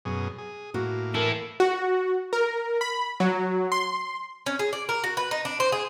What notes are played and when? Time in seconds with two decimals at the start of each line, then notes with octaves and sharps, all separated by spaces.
0.05 F#2 B2 G#4
0.38 G#4
0.74 A2 A#3 F#4
1.14 E3 E4 A4 A#4
1.60 F#4
2.33 A#4
2.81 B5
3.20 F#3
3.72 C6
4.46 C#4
4.59 G#4
4.73 D5
4.89 A#4
5.04 F#4
5.17 B4
5.31 D#4
5.45 D4
5.60 C5
5.72 G#4